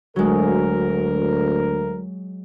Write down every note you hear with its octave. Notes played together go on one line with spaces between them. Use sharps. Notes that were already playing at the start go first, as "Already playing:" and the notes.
D2 F#3 G#3 A#4